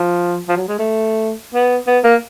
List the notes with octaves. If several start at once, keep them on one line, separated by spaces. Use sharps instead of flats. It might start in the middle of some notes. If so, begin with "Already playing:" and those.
Already playing: F3
F3
F#3
G#3
A3
B3
B3
A#3